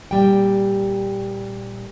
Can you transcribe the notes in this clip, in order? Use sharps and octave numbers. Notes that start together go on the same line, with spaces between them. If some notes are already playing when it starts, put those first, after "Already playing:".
A#2 G3 G5